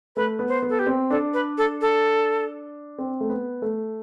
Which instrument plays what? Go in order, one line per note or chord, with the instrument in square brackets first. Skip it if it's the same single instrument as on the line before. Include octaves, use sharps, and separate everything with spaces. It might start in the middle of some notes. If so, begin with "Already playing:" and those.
[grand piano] A3 [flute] B4
[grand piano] B3
[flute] C5
[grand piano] B3
[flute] A4
G4
[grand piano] C4
[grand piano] D4 [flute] A4
[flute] B4
A4
A4
[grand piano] C4
A3
B3
A3